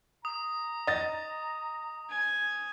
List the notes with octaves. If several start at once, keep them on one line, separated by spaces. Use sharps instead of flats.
A#5 D#6
D#5 A6
G#5